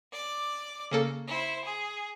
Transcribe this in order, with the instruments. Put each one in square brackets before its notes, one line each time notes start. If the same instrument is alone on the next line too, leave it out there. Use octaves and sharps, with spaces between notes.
[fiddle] D5 D6
[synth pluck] C#3 A#3 A4
[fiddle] E4 C5
G#4